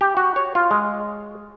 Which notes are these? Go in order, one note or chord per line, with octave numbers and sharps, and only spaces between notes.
G4
F#4
C#5
F4
G#3